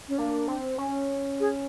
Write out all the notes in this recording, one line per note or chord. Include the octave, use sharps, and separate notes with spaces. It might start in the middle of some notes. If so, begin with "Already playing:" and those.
C#4
A#3 D4
C4
C#4
G#4